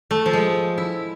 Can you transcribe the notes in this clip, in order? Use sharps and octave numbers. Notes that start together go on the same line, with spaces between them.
A3
F3
G#3
E4